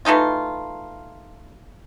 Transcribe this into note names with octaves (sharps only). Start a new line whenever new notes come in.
E3 A3 D#4 F4